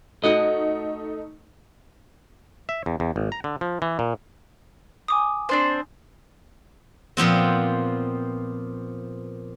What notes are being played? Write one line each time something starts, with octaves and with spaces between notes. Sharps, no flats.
A3 D#4 F#4 D#5
E5
E2
E2
G#1
A#5
D3
F3
E3
A#2
G#5 D6 D#6
C4 D4 C5
A#2 F3 B3 C4